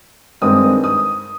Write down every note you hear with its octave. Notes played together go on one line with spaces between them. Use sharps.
G2 D#3 G#3 C4 D#6
D#6